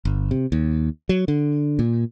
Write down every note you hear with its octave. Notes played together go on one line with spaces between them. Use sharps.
G1
C3
D#2
F#3
D3
A#2